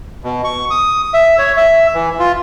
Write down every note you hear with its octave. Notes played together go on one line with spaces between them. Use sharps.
B2
C#6
D#6
E5
C#5
E5
E3
F4